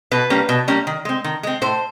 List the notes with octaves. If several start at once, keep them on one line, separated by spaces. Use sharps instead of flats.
B2 B4
G3 A#3 C#4
B2
G3 A#3 C#4
D#3
G#3 C4
D#3
G#3 C4
A2 C5